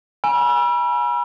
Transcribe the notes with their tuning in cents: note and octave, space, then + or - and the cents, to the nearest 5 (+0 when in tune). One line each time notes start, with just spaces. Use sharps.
G#5 +0 B5 -35 E6 +35